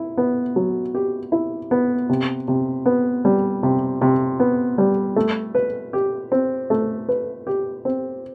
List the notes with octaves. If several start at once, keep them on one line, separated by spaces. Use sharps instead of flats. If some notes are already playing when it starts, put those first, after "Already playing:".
Already playing: E4
B3
F#3
G4
E4
B3
C3
C3
B3
G3
C3
C3
B3
G3
A3
B4
G4
C4
A3
B4
G4
C4